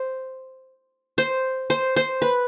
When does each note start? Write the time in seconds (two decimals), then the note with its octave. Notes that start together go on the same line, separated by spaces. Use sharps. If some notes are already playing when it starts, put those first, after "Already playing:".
Already playing: C5
1.18 C5
1.70 C5
1.96 C5
2.22 B4